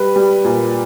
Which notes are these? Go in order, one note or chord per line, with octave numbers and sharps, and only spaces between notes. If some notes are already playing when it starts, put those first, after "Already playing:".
Already playing: G3 B4
G3
A#2